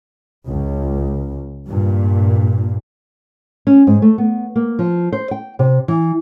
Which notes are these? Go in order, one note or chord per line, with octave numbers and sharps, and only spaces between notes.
C#2
G2 A#2
C#4
G#2
A3
B3
A#3
F3
C5
G5
C3
E3